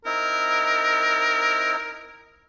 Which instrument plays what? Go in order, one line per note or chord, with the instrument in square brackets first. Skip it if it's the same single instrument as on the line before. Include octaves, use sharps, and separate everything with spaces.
[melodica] C4 D#4 E4 [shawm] A#4